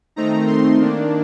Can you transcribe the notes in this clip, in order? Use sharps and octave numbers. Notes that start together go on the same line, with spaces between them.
D#3 A3 C4 D#4 A#5
C6
D#3 A#3 D4